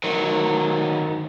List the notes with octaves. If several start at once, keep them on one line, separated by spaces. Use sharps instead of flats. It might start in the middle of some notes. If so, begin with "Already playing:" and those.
D#3 F#3